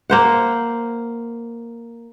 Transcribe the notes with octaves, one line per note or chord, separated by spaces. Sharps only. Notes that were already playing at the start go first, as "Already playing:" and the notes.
A#3 C5 F#5